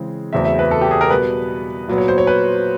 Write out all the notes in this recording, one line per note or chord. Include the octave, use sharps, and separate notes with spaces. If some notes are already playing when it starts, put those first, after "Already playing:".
Already playing: C#3 E3 G#3 C4
E2 C#3 F#3 A3 C4 E5
E5
B4
A4
G4
G#4
A#4
B2 G3 B3 B4
A#2 F#3 B3
C#5
C5
C#5
B4